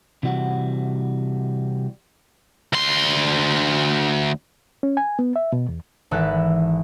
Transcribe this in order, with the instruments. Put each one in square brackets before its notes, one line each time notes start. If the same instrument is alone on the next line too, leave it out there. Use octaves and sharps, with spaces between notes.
[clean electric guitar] C3 E3 G3 F#4 F#5
[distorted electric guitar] D2 C6
[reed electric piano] C#4
G#5
B3
E5
B2
E2
[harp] G#1 E3 A4 B4 E5 F#6